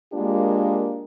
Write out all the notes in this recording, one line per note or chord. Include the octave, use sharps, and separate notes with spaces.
G#3 A#3 D4 F4 G4 A#4